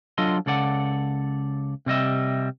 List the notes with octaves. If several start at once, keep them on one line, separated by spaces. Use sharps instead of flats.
F#3 D4 F4 A4 D#5 C6
C#2 C#3 A4 D5 F#5
C3 G3 D#5 E5